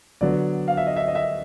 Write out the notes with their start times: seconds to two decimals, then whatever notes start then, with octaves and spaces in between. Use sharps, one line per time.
0.21 D3 F#3 B3 D5
0.68 F5
0.77 E5
0.87 D#5
0.96 E5
1.08 D#5
1.15 E5